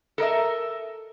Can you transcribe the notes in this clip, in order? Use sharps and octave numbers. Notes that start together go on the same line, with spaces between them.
A4 A#4 D#5 E5